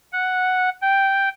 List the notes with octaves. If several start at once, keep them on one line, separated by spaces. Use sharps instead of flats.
F#5
G5